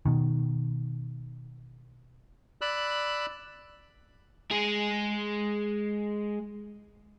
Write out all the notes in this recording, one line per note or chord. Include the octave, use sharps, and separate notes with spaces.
B2 D#3
D5 B5 E6 F#6
G#3 G#4